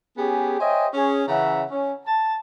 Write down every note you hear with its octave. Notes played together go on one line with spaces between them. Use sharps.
B3 C#4 G4 G#4
C5 C#5 D#5 E5 G5 G#5
C#4 G#4
C#3 E3 C#4 E5 F#5 A#5
C#4
A5